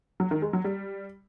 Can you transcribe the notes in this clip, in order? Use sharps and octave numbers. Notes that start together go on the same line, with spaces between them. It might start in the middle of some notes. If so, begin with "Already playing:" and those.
F#3
D#3
G#3
F#3
G3